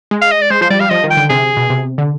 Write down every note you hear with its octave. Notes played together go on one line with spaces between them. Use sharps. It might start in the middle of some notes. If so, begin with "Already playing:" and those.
G#3
F5
D#5
D5
G#3 C5
F3 C5
G3 D5
G3 F5
F3 D#5
D#3
G5
D3
C3 G#4
B2
C3
D3